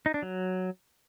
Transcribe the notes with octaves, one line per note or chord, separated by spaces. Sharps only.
D#4
D4
F#3